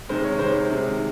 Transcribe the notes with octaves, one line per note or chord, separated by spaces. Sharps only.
C3 D#3 G#3 C5
C#5
C3 D#3 G#3 C5
C5
C3 D#3 G#3